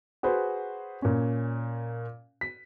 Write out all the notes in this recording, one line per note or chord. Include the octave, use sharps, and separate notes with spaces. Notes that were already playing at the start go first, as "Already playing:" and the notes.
F#4 G#4 B4 C5
A#2 C#4
B6